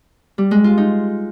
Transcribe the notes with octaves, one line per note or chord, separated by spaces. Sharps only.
G3
G#3
F4
D#4